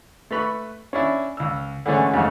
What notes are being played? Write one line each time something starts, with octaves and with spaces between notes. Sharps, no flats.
A3 B4 B5 C#6
C#4 D4 E4
C#2 E6
D3 E3 G#3 A3 C#4
F2 G#2 C#3 G#3 A3